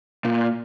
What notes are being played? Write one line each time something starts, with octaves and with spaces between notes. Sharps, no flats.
A#2